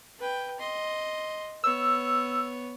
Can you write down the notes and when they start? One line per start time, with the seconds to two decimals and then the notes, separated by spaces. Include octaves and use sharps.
0.19 B4 G5
0.59 D#5 C6
1.64 B3 C#5 E6